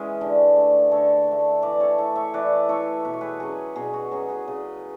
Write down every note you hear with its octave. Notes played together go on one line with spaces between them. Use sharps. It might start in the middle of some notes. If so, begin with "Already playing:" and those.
Already playing: E3 G#3 C#4 E4 F#4 G#4 B4
D3
A3 D4
D3 A4 C#5
A3 D4
E3 B4 D5
A4 C#5
A3 E4
C#5 E5
E3 B4 D5
A3 E4 A4 C#5
B2 B4
C#5
G#4 B4
F#3 C#4 G#4
B2 G#4
F#4
F#3 C#4 G#4
G#4 B4
C#3